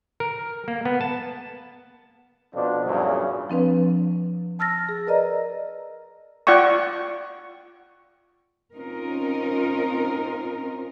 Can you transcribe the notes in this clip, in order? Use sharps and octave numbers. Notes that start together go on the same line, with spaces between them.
A#4
A#3
B3
A5
F2 B2 F3 D4
E2 G2 A#2 C#3 F#3
F3 C4 D4 B4
A5 E6 F6 A6 A#6
G#4
A#4 B4 D5 D#5 A#5
F4 D5 F#5 G5 C#6
C4 C#4 D#4 F4 A#4